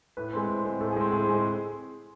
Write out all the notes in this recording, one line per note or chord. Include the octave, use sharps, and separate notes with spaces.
A2 B4
G#3 C4
A2
G#3 C4
A2 A4
G#4
G#3 C4
A2 G#4
G#3 C4